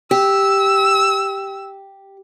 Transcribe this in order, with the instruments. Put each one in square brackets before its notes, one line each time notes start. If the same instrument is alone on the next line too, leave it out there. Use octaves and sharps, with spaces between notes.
[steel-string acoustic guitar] G4 [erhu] E6